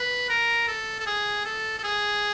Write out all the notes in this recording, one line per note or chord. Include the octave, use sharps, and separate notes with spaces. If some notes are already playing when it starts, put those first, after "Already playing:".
Already playing: B4
A#4
A4
A4
G#4
A4
A4
G#4